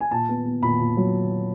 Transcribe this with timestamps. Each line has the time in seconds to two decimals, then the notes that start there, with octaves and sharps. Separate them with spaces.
0.01 G#5
0.11 A#2 A5
0.29 B3
0.45 B3
0.62 A#2 B5
0.79 A#2
0.97 F#3